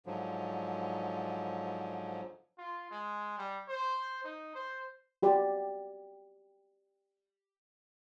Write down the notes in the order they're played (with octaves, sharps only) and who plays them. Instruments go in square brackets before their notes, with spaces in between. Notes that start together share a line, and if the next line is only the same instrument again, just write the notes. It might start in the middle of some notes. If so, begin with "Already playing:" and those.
[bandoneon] G#2 D3 F3 F#3
[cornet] F4
G#3
G3
C5
D#4
C5
[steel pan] F#4 G4 D5